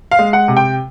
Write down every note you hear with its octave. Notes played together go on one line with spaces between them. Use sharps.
F5
G#3
F#5
C3
G5